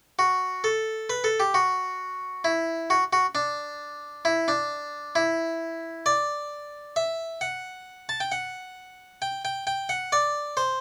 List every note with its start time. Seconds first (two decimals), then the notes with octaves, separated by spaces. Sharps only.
0.19 F#4
0.64 A4
1.10 B4
1.24 A4
1.40 G4
1.54 F#4
2.44 E4
2.90 F#4
3.13 F#4
3.35 D4
4.25 E4
4.48 D4
5.16 E4
6.06 D5
6.96 E5
7.41 F#5
8.09 A5
8.20 G5
8.32 F#5
9.22 G5
9.45 G5
9.67 G5
9.89 F#5
10.12 D5
10.57 C5